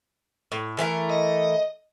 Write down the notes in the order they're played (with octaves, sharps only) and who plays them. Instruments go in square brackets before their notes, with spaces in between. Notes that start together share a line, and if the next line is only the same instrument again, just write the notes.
[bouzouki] A2
E3 A3 A#4
[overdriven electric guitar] D#5